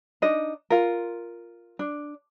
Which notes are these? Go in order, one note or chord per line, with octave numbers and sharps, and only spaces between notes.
D4 D#4 D#5
F4 A#4
D4